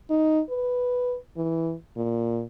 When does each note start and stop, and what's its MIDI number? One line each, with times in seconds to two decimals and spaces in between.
0.10 0.41 63
0.50 1.16 71
1.37 1.74 52
1.97 2.43 46